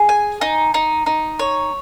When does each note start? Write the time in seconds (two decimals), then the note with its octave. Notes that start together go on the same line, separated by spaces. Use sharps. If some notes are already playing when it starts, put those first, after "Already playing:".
Already playing: G#4
0.09 G#5
0.41 D#4
0.74 D#4
1.06 D#4
1.39 C#5